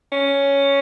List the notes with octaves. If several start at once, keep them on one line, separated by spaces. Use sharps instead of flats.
C#4